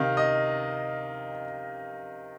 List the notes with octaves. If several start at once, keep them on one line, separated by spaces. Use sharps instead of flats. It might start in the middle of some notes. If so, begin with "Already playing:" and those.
Already playing: C3 D#3 F5
D#5